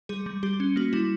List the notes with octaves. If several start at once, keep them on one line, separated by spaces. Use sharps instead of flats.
G3 G#4
G3
G3 G4
C#4
A#3 F#4
G3 E4